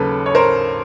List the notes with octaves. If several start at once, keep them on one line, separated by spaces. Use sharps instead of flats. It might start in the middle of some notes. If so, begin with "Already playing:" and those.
Already playing: D#2 C#3 F#3 A4 B4
C#5
A#4 C5